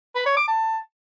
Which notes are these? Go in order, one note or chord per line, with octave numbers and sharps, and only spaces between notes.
B4
C#5
D6
A5